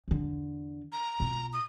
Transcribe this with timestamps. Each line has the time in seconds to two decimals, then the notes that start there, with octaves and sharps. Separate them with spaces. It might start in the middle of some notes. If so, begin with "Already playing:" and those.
0.08 E2 D3
0.92 A#5
1.20 B2 F4
1.53 D#6